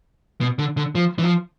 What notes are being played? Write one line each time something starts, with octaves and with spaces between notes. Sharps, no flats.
B2
D3
D3
F3
E3
F3